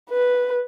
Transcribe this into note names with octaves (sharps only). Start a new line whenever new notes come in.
B4